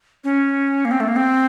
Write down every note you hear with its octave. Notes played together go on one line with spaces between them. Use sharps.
C#4
A#3
C4
A3
A#3
C4